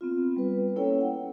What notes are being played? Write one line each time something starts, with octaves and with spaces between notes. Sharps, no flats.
B3 C4 F4
G3 B4
A#3 C#4 E4 A4 C#5 G5
F#5